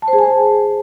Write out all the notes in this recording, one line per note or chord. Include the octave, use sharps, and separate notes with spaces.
A5
C5
G#4
G#5